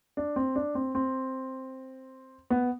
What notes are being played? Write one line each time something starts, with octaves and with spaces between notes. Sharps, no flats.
D4
C4
D4
C4
C4
B3